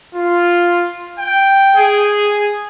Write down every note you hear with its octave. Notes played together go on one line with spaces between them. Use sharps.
F4
G5
G#4